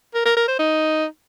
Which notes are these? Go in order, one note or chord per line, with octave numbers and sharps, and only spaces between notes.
A#4
A#4
A#4
C5
D#4